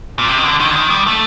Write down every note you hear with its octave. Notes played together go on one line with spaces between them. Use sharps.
A#2
C3
D#3
D3
D#3
D3
D#3
G3
A3